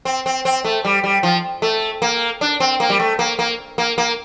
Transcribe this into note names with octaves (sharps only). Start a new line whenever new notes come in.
C4
C4
C4
A3
G3
G3
F3
A3
A#3
D4
C4
A#3
G3
A3
A#3
A#3
A#3
A#3